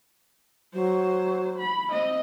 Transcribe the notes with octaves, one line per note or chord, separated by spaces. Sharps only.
F#3 C5
B5
C4 D#5